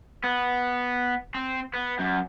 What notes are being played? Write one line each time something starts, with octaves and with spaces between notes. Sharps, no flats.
B3
C4
B3
F#2